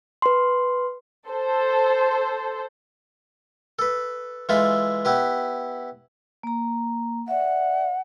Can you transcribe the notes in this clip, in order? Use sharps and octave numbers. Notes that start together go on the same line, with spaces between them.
B4 C6
A4 C5
A4 B4
E3 G#3 F4 A4 E5
B3 E4 G4 B4
A#3 A#5
D5 E5 F#5